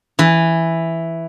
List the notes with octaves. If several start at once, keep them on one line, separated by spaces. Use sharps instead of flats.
E3